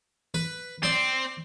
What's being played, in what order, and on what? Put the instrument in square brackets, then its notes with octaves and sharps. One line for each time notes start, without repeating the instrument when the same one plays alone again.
[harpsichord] B4
[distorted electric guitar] C4 [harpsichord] D5 C6